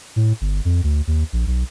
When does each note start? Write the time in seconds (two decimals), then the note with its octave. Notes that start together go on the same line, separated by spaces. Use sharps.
0.16 A2
0.41 G1
0.65 F2
0.84 D2
1.07 D#2
1.33 A#1
1.47 B1